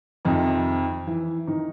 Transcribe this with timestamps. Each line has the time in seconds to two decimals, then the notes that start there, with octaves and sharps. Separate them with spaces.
0.25 F2 C3 D#3 D#4
1.07 E3 E4
1.47 D#3 D#4